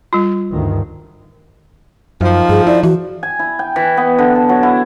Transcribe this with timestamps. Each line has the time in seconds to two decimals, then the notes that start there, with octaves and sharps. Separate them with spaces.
0.13 G3 F4
0.51 D2 G2 D#3
2.21 F#2 D#3 F3
2.49 G2 G#4
2.67 E4 D5
2.83 E3 F#4
3.23 G#5
3.39 E4
3.59 G5
3.76 E3
3.97 B3
4.18 D3
4.35 A5
4.49 F#3
4.63 E4